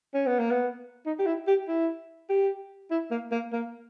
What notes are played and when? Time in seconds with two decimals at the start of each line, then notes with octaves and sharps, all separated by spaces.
0.14 C#4
0.26 B3
0.39 A#3
0.51 B3
1.06 D#4
1.19 G4
1.26 E4
1.47 G4
1.68 E4
2.29 G4
2.91 E4
3.11 A#3
3.32 A#3
3.53 A#3